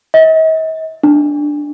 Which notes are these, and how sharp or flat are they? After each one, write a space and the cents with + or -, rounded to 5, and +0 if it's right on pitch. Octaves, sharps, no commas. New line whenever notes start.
D#5 +45
D4 +5